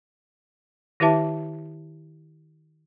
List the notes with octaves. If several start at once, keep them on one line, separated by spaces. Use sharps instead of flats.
D#3 E4 G4 B4 E5 A5